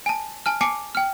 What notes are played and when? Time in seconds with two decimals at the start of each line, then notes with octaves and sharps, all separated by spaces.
0.06 G#5 A5
0.46 G#5 A5 F6
0.61 G#5 A5 D6 C7 C#7
0.95 G5 F6